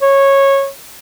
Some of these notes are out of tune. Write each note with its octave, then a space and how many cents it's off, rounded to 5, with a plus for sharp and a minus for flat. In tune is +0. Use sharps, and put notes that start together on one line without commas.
C#5 -15